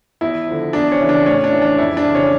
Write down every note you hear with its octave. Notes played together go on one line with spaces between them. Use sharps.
E2 E4
D3 F3
E2 D4
C#4
C#3 E3
D4
A2 C#4
D4
E3
D4
F2 E4
D4
C#3 E3
C#4